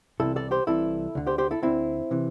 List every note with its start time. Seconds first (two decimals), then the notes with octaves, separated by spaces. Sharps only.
0.20 C2 C3 E3 E4 A4
0.36 A4 D5
0.51 G4 C5
0.67 C2 C3 E3 E4 A4
1.15 D2 D3
1.27 G4 C5
1.38 G4 C5
1.51 E4 A4
1.62 D2 D3 C4 E4
2.11 C3 E3